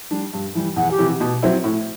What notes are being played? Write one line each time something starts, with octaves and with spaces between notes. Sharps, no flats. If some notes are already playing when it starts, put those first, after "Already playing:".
G3 D4
G2
E3 G3
E2 F#5
G4
C3 E3
B2
F#3 C4 E4
A2